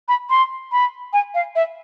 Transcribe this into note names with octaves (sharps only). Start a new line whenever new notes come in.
B5
C6
B5
G#5
F5
E5